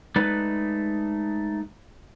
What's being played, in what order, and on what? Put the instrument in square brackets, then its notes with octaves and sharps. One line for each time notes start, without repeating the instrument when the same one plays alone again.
[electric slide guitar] G#3 A3 D#4 B4 D5